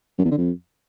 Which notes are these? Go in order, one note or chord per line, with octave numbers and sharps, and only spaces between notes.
F#2
E2
D3
F2